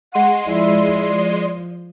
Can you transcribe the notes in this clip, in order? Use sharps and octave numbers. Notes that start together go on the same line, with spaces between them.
G#3 F#5 C6 D#7
F3 E4 D5
F3